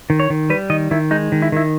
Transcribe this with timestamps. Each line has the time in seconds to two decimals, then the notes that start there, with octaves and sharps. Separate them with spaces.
0.10 D#3
0.20 C#5
0.30 D#3
0.50 G3 B4
0.70 D#3 D#5
0.91 D#3 E4
1.11 G#3 D#4
1.32 D#3
1.42 E4
1.52 D#3 E4